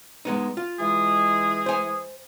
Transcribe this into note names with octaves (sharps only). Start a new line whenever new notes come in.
G#3 B3 D#4
F4
E3 G#3 G#4
C5 G#5